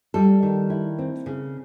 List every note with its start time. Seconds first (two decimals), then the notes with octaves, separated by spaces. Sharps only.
0.14 G3 A4
0.43 D#3
0.70 E4
0.99 C4
1.26 C#3